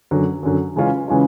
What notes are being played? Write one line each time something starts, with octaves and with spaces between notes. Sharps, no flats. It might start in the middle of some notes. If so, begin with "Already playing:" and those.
F#2 D3 F#3
F#2 D3 F#3
C#3 E3 G#3 C#4 F4
C#3 E3 G#3 C#4 F4